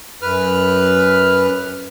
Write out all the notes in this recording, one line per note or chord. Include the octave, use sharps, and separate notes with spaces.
F#2 B4 F6